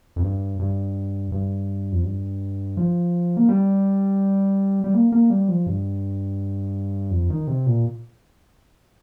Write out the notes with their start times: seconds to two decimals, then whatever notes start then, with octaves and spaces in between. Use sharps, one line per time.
0.16 F2
0.22 G2
0.59 G2
1.32 G2
1.92 F2
2.04 G2
2.77 F3
3.37 A#3
3.49 G3
4.84 G3
4.94 A#3
5.12 A#3
5.30 G3
5.48 F3
5.66 G2
7.11 F2
7.30 D#3
7.47 C3
7.66 A#2